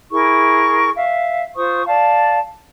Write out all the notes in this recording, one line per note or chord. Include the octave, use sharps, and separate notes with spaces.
E4 G#4 A#4 C#6
E5 F5
F4 C5 C#6 D#6
D5 F5 A5